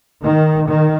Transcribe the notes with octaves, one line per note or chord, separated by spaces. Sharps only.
D#3
D#3